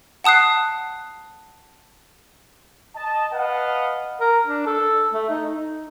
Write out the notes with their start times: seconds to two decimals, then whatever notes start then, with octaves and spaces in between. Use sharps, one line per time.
0.24 F#5 A5 D#6 F#6 C7
2.96 D#5 A5
3.33 B4 D#5 F5 F#5 A5
4.20 A#4
4.47 D4
4.66 A4
5.14 A3
5.30 D#4
5.46 D#4